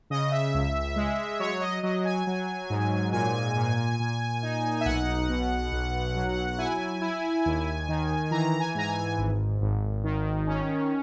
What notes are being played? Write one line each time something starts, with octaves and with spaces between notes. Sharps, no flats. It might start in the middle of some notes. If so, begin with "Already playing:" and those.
C#3 D#5
E5
C#2
G#3
F#3 C#5
D#5
F#3 D#5
G#5
F#3
G#2
A#2 G#5
A#2
A#2
D#4
E5
B1 F#5
B2
B1
F#3
E4 G#5
E4
D#2
D#3
E3 A#5
G#5
G#2 A#5
G#5
G#1
G#1
D#3
C#4